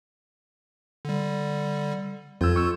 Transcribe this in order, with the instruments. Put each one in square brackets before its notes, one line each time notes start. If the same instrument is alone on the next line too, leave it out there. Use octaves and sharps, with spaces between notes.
[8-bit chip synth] D3 G3
[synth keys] F2 E6 [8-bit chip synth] F4 G6 G#6
[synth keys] C#6 E6